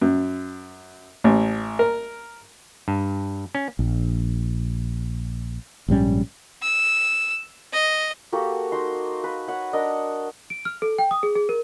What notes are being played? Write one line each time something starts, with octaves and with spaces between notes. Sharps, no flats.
F#2
A1
A#4
G2
C#4
A#1
A#1 G#2 G3 C#4
E6
D#5
A#3 F#4 G4 A4
D#4 F#4 C6
B4
C#5 F#5
D4 A#4 D#5
D7
F6
A4
G5
D#6
G#4
G#4
A#4